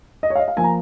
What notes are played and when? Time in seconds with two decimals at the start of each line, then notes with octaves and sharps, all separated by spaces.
0.23 D#5
0.30 C#5
0.35 F5
0.39 D#5
0.48 F5
0.57 F3 A#3 G#5
0.64 A#5